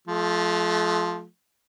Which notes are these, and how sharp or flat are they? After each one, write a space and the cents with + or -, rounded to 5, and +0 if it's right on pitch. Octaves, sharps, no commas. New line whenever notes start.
F3 +0 A3 -40